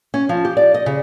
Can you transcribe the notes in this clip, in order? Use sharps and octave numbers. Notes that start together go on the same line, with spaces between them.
C#4
F3
G4
D5
D#5
C#3